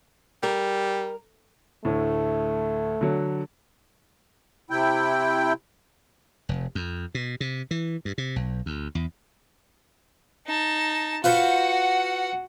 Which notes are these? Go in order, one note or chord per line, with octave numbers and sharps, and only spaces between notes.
G3 A#4
D2 A2 A3
D3 F#3
C3 E4 G5
F1
F2
B2
C3
E3
G2
C3
B1
D2
E2
D#4 A5
F4 F#4 B4 C5 F#5